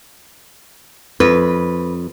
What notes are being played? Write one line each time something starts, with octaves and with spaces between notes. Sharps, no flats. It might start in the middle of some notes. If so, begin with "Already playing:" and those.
F2 B4